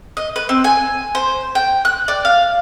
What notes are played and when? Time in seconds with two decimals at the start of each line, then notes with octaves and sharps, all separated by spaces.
0.17 D#5
0.36 B4
0.49 C4
0.64 G#5
1.15 C5
1.55 G5
1.85 F#6
2.08 D5
2.25 F5